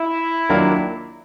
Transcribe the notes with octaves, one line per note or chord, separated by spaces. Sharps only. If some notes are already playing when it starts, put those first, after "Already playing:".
Already playing: E4
D#3 F#3 A#3 D4 F4